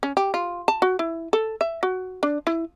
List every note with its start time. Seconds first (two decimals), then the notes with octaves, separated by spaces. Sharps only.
0.03 C#4
0.17 G4
0.34 F4
0.68 A5
0.82 F#4
0.99 E4
1.33 A4
1.61 E5
1.83 F#4
2.23 D4
2.47 E4